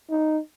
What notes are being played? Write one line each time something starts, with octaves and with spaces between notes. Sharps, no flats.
D#4